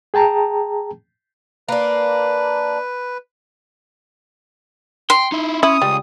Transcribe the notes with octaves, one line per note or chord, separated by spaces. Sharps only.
G#4 G5 A5 A#5
A#3 D4 B4
G5 C6
D#4 E4
C#4 E4 D#6
C#2 G3